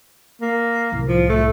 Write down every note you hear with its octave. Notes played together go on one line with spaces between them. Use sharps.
A#3
C2 A2
F3
A3